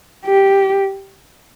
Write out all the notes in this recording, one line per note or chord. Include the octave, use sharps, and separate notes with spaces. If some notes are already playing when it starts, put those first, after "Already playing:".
G4